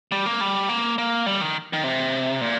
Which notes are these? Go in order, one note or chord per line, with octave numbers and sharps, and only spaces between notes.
G3
A#3
G3
A#3
A#3
G3
D#3
D#3
C3
A#2